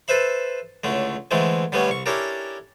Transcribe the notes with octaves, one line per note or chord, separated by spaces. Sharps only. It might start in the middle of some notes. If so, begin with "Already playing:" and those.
A4 B4 C5 E5 B5
C#2 A2 D3 A3
D3 E3 G#3 A3 C4
D3 G3 A3 B3 C#4
C2 C#6
C#4 D4 E4 G4 A4 A#4